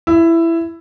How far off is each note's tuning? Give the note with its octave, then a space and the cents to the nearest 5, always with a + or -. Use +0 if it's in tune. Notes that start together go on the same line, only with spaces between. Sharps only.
E4 +10